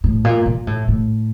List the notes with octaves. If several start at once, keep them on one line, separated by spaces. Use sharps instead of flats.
A2
A#2
A#2
A2
A2